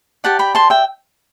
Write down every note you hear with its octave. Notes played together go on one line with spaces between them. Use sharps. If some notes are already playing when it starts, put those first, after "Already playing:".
G4 D5 F#5 A5
G5 B5
A5 C6
E5 G5